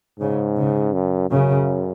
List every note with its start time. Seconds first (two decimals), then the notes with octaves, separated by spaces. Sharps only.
0.19 G#2 C#3
0.57 C#3
0.93 F#2
1.30 F#2 C#3